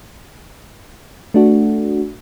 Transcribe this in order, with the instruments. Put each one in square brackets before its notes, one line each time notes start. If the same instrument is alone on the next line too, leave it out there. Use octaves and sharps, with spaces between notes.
[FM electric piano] A3 D4 F#4